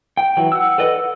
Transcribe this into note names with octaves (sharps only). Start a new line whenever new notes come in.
G5
E3 F#3
F#5 E6
A4 B4 D5 D#5
F#5